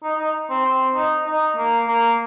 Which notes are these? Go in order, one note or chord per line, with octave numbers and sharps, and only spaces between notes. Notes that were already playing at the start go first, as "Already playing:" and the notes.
D#4
D#4
C4
C4
D#4
D#4
A#3
A#3